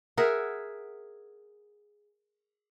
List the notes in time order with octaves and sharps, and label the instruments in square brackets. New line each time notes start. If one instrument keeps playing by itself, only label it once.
[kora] G#4 A#4 E5 F#5